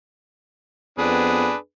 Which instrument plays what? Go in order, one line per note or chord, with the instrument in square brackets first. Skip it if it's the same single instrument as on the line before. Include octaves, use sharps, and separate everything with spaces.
[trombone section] F2 B3 [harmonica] D4 G#4 B4